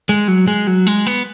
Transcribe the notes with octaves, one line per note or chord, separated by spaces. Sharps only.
G#3
F#3
G#3
F#3
G#3
B3